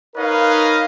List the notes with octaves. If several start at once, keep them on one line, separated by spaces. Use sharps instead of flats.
D#4 A#4 B4 C#5 D#5 F5